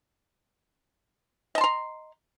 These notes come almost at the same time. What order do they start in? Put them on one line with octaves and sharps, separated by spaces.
D#5 A5 C6 A#5